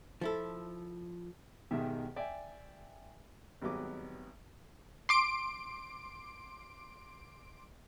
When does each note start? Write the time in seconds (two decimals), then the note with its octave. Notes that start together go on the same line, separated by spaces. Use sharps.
0.21 F3 E4 A4
1.71 B1 G#2 B2 D#3 G4 E5
2.16 D5 E5 G5 G#5
3.62 G#1 F#3 G3 B3 D#5 D6
5.09 C6 D6 D7